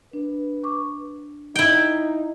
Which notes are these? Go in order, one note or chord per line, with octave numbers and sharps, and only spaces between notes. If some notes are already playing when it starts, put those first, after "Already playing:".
D4 B4
C#6 D6
D#4 E4 G5